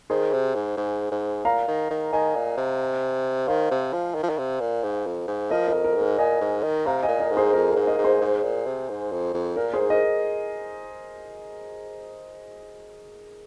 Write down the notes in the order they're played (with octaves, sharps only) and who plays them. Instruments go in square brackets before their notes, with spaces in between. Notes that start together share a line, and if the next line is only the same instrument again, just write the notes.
[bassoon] D#3 [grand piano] G#4 C5
[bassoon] C3
G#2
G#2
G#2
[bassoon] A#2 [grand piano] F5 A#5
[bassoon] D#3
D#3
[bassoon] D#3 [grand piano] D#5 G#5
[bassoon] A#2
C3
[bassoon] D#3 [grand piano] C5 F5
[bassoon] C3
F3
D#3
F3
D#3
C3
A#2
G#2
F2
G#2
[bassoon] F3 [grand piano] A#4 D#5
[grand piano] A#4 D#5
[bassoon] F2
[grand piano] A#4
[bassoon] G#2
[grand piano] A#4
[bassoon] A#2 [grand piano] D#5 G#5
[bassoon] G#2
D#3
[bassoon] C3 [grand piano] F5 A#5
[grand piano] D#5 G#5
[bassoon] A#2
[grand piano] A#4 D#5
[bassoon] G#2
[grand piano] G#4 C5
[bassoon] F2 [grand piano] A#4
[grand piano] A#4
[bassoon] G#2
[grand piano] A#4 D#5
[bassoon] G#2
[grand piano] G#4 C5
[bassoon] G#2
A#2
C3
G#2
F2
F2
[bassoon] A#2 [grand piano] A#4
[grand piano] G#4 C5
[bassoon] G#2
[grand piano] A#4 D#5